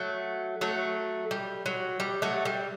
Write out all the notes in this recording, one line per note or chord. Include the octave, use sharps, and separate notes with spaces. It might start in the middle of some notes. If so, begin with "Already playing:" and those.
Already playing: F#3 A3
F#3 A3
G3
F#3
G3
F#3 A3
G3